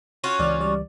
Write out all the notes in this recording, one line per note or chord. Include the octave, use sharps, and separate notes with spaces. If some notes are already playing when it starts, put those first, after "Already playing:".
C#4 F4 F#4
C#2 E3 D5
G3 D5